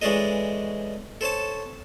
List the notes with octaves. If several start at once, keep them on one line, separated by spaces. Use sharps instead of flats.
E3 G#3 C#4 D4 A4 D#5
A4 C5 C#5 A5